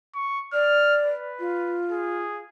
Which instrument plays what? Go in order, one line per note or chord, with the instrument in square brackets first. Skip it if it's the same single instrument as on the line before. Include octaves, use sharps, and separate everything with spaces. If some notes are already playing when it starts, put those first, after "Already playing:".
[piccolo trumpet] C#6
[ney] D5 [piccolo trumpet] F6
[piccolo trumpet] B4
[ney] F4
[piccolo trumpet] G#4